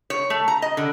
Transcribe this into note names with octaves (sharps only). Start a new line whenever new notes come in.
C#5
A3
A#5
D#5
D3